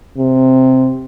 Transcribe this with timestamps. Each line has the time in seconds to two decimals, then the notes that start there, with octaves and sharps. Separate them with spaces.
0.18 C3